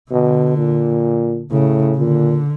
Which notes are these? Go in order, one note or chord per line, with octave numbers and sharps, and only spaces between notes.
B2 D3
A#2
A2 C#3
A#2 D3